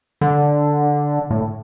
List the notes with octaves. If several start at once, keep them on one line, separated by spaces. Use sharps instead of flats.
D3
A2